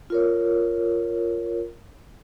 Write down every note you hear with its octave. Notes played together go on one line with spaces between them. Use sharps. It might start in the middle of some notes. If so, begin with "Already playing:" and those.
F4 A#4 C#5